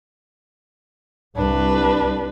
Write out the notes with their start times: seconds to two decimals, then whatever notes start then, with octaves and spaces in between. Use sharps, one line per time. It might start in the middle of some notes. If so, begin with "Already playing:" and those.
1.37 C2 D4 B4